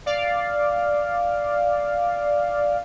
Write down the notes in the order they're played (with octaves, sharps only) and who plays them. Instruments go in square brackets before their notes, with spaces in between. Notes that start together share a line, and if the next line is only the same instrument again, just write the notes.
[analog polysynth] D5 F5